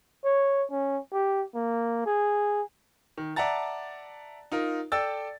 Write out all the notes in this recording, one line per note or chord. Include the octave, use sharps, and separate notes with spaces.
C#5
C#4
G4
A#3
G#4
D#3
D5 E5 F#5 A5 A#5 A6
D#4 F4 A#4
A4 D5 G5 E6 A6